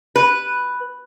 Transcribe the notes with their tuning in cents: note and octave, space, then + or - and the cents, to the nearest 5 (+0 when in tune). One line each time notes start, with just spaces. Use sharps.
B4 +0